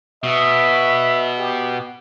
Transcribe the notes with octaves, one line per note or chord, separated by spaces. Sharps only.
B2 E5
G4